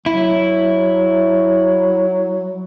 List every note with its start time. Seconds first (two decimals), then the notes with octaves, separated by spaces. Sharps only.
0.06 F#3 E4